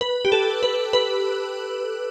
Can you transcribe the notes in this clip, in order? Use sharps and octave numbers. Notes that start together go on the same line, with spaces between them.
B4
G4
A4
B4
B4